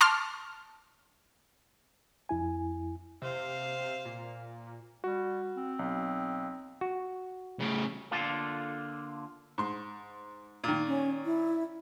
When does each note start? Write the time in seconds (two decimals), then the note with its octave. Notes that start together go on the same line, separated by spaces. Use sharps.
0.01 A5 C6 D6 F6
2.29 F2 E4 G#5
3.22 C3 C5 F5
4.05 A#2
5.04 G3 F#4
5.56 C4
5.79 B1
6.81 F#4
7.60 A2 C#3
8.11 D3 A#3 F4 A4
9.58 G#2 C6
10.64 A#2 D#3
10.87 C#4
11.25 E4